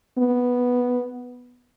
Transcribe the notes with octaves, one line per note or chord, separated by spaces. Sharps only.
B3